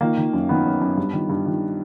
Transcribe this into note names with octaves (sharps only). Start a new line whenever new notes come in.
D#3 A#3
D#3
F#2
D#3 B3
F#2
F#2
G2
D#3
G2
D#3